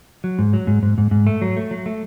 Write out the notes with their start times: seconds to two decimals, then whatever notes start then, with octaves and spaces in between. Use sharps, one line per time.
0.24 F#3
0.39 G#2
0.53 F#3
0.67 G#2
0.83 G#2
0.98 G#2
1.11 G#2
1.27 A3
1.42 F#3
1.57 A3
1.71 F#3
1.86 A3